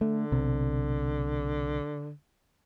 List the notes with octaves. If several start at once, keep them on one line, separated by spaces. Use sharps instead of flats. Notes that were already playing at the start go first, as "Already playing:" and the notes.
D3 A3
B1 C3